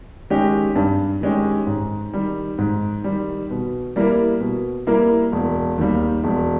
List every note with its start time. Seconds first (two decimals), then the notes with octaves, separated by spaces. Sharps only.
0.30 D#3 G#3 C#4 G4
0.75 G2
1.21 D#3 G#3 C#4 G4
1.67 G#2
2.13 D#3 G3
2.58 G#2
3.04 D#3 G3
3.50 B2
3.96 G3 A#3 E4 A#4
4.40 B2
4.87 G3 A#3 E4 A#4
5.32 E1
5.78 D#2 D#3 G3
6.24 E1